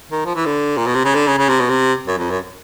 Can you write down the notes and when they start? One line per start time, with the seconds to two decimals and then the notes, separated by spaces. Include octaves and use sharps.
0.11 D#3
0.25 F3
0.35 E3
0.46 D3
0.77 A#2
0.86 B2
0.95 C3
1.04 C#3
1.15 D3
1.27 C#3
1.38 C#3
1.49 C3
1.60 B2
1.69 C3
2.07 F#2
2.18 F2
2.31 F#2